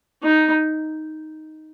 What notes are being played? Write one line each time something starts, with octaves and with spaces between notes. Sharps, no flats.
D#4